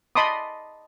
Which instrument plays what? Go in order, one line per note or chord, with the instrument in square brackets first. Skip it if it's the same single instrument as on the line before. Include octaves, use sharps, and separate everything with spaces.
[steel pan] D#5 A5 B5 C6 D6 D#6